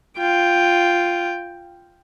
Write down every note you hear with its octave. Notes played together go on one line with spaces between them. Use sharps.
F4 G5